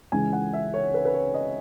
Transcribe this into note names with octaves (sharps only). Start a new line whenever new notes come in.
C#2 C#3 E3 G#3 G#5
F#5
E5
C#5
B4
B4
C#5
D#5